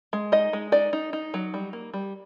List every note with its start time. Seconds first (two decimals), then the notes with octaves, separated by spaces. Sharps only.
0.13 G#3
0.32 D#4 D#5
0.53 G#3
0.72 D#4 D5
0.93 D#4
1.13 D#4
1.34 F#3
1.54 G3
1.73 A#3
1.94 G3